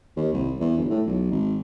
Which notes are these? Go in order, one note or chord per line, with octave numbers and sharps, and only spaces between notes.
D#2
C2
E2
G1
A2
B1
G#1